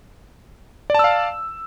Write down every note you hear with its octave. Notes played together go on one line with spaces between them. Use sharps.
D5 F5 A5 E6